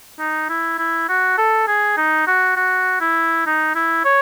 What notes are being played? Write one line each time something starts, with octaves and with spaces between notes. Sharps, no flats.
D#4
E4
E4
F#4
A4
G#4
D#4
F#4
F#4
E4
D#4
E4
C#5